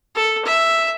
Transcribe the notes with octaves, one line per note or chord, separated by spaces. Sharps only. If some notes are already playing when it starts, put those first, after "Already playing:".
A4
E5